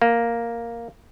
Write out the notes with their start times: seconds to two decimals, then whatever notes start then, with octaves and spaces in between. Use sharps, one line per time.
0.02 A#3